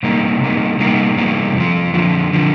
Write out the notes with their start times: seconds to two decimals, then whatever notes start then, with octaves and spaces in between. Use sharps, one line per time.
0.03 C3 G3 A#3 D#4
0.41 C3 G3 A#3 D#4
0.80 C3 G3 A#3 D#4
1.17 C3 G3 A#3 D#4
1.55 F2 D3 F3
1.94 F2 D3 F3
2.33 D3 F3